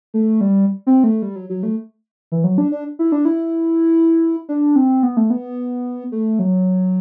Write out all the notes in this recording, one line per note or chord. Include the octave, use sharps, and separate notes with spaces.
A3
G3
C4
A3
G3
F#3
F#3
A3
E3
F#3
D4
D4
E4
D4
E4
D4
C4
B3
A3
B3
A3
F#3